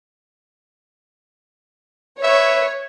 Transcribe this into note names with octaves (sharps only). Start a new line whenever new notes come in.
B4 C#5 E5